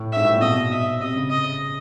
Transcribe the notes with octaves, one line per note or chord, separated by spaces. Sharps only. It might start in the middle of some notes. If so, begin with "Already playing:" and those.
Already playing: A2
G#2 E5
A2
A#2
B2 D#5
E5
C3 D#5
C#3
D#5